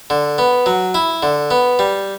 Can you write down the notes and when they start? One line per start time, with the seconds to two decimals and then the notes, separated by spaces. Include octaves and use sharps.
0.10 D3
0.38 B3
0.66 F#3
0.94 E4
1.23 D3
1.51 B3
1.79 G3